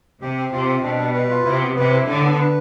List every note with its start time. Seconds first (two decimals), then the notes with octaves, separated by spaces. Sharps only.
0.22 C3 G4
0.37 C4
0.52 C3 F4
0.68 C4
0.83 B2 D4
0.99 G3
1.14 B4
1.30 F4
1.45 C3 E4
1.61 B3
1.76 C3 B4
1.92 E4
2.07 A2 D3
2.23 B3
2.38 B4